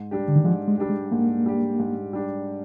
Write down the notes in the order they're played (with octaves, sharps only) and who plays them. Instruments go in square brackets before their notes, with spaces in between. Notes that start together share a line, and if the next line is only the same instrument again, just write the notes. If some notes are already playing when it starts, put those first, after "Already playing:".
Already playing: [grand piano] G#2
G3 D4 G4
[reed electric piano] D3
D#3
[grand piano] G#2 [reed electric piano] F3
[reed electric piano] G#3
[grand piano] G3 D4 G4
[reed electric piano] G#3
[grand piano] G#2 [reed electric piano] A#3
[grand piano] G3 D4 G4
G#2
G3 D4 G4